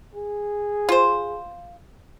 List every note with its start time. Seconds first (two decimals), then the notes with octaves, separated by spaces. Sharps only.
0.14 G#4
0.89 F4 C5